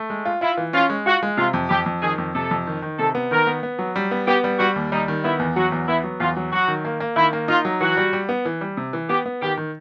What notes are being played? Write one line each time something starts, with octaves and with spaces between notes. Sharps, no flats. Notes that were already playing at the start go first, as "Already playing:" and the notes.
Already playing: A3
G#3
F4
E4 F4
E3
C#4 F4
G#3
F4 F#4
G#3
C3 F4
F2
F2 G4
F2
D#3 G#4
F2
C3 A4
F2
D#3
D#3
C3 A4
B3
D#3 A#4
B3
B3
F#3
G3
B3
B3 G4
G3
G3 F#4
D#2
G3 D#4
D#3
B3 E4
E2
F#3 F#4
E2
B3 E4
F#3
E2 F4
F#3
F#3 F#4
D#3
A#3
A#3
D#3 E4
A#3
D#4 F4
F#3
E3 F#4
G3
G3
B3
E3
G3
C3
E3
B3 G4
B3
D#3 G4
D#3